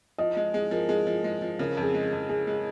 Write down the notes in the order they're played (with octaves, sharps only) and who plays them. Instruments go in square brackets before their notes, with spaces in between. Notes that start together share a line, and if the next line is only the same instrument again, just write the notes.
[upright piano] F3 [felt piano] D#5
[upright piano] G#3
[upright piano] G#3 [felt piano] G#4
[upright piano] F3 [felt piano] A#4
[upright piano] G#3 [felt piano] G#4
[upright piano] F3
G#3
F3
[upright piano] C#3 [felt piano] A#4
[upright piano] F2
[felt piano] G#4
[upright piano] G#3
F2
[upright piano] G#3 [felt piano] G#4
[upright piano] G#3